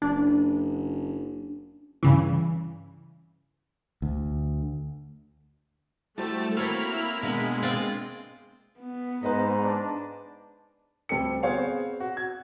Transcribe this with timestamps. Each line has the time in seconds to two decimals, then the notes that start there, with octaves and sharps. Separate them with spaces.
0.02 F#1 D4
2.03 G2 C#3 E3
4.02 D2
6.18 G3 A3 E4 F#4 C5 A5
6.57 A#3 C4 C#5 F5 B5 F6
6.89 E4
7.23 B2 G#3 A#3 B3 D4 E4 A#4 B5
7.62 C4 F4 D5
8.80 B3
9.23 G#2 B4 C5 D#5 A#5
9.63 D4
11.09 D2 G3 C4 A4 G5 C#7
11.43 B3 C4 G#4 C5 C#5 F5
12.00 F#4
12.17 G#6